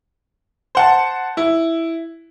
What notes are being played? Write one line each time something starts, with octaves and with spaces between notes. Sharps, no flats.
C5 F#5 A5
E4